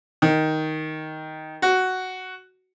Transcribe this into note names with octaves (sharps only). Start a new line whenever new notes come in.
D#3
F#4